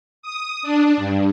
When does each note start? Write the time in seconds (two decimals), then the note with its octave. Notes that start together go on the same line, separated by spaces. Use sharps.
0.23 D#6
0.63 D4
0.97 G2